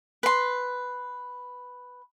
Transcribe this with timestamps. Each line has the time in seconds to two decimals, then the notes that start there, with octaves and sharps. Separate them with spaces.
0.23 B4 C6